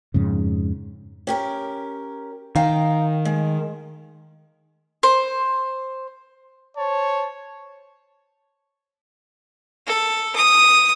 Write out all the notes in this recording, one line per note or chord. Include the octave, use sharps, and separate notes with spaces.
F2 G#2 C#3
C#4 G4 A#4
D#3 F5 G5 A#5
G#3
C5
C5 C#5 A5
A4
D#6